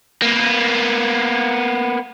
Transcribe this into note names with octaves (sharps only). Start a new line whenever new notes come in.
A#3 B3